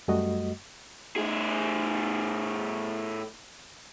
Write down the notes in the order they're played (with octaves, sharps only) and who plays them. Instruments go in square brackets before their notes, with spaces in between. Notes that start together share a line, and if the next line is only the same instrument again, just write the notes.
[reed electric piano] F#2 G3 A3 F#4 D#5
[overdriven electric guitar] A2 G#4